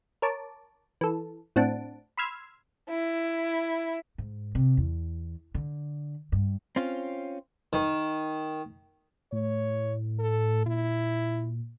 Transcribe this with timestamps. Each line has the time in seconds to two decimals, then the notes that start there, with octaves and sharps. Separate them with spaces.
0.22 A#4 C#5 A5 D6
1.01 E3 A4
1.56 A2 C4 D4 F#5 A5 D7
2.17 B5 C6 E6 F6 G#6 C7
2.89 E4
4.18 G#2
4.55 C3
4.77 E2
5.55 D3
6.32 G2
6.76 C4 C#4 F4
7.73 D#3
9.32 A2 C#5
10.19 A4
10.66 A#2 E4